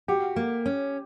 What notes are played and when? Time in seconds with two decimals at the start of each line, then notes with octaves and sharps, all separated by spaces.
0.08 F#4 G4
0.36 A#3
0.66 C#4